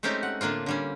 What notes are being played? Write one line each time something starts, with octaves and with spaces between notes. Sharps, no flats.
G#3 A3 C4 C#4 D#4 G4
F#5
A2 D3 A#3 D4 F4
D3 G3 C#4